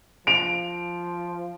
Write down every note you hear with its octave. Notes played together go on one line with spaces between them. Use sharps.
F3 D7 F7